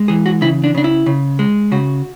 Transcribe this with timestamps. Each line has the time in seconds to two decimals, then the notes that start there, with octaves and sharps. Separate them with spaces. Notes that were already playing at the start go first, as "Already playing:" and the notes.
Already playing: G#3
0.08 E3 G#4
0.26 F#4
0.41 C#3 E4
0.64 D4
0.74 C#3 D4
0.84 E4
1.06 C#3
1.39 G#3
1.71 C#3 F#4